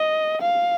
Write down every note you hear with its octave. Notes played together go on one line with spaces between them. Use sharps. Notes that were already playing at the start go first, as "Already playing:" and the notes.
Already playing: D#5
F5